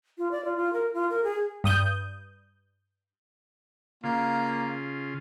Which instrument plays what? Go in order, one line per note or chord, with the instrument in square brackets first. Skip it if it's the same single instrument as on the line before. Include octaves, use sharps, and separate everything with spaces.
[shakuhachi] F4
D5
F4
F4
A#4
F4
A#4
G#4
[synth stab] G2 D#6 G6
[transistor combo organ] C#3 F4 [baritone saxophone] A#3